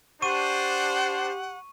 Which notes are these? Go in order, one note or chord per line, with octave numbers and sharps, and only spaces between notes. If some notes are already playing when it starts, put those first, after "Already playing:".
D4 G4 C5 F#5 C#6 D#7